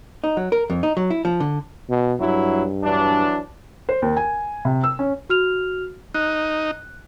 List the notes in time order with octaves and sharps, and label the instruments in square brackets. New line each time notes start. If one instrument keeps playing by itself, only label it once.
[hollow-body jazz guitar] D#4
F#3
A#4
F2
D#4
F#3
E4
F3
D3
[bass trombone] B2
[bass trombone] G2 [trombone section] F#3 E4
[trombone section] E3 F#3 D4
[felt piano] C5
D#2
G#5
C3
E6
C#4
[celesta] F#4 F6 F7
[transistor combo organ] D#4 [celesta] F#6